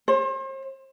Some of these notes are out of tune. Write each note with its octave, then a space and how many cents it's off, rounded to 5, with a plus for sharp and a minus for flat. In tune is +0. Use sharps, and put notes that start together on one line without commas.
C5 +40